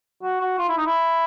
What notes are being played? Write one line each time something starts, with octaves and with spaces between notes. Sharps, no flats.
F#4
F#4
F4
E4
D#4
E4